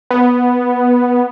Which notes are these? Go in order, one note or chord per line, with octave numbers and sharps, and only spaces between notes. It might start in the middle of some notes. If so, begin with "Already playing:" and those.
B3